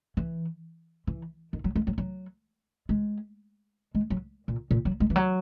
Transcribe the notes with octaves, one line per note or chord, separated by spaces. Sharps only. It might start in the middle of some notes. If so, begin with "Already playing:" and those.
E3
E3
D#3
F#3
G#3
F#3
F#3
G#3
G#3
F#3
A#2
A#2
F#3
G#3
E3
F#3